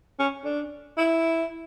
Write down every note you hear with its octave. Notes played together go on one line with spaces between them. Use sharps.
C#4
D4
E4